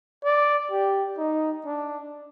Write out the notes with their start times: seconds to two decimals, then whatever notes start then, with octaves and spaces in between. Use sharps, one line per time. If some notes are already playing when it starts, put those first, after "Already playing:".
0.24 D5
0.71 G4
1.18 D#4
1.65 D4